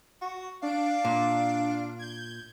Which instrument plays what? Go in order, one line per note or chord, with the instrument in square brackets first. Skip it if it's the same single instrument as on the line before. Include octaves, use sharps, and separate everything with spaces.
[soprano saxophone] F#4
[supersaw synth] D4 D7 [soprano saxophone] F5
[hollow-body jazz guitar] A#2
[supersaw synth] G6 G#6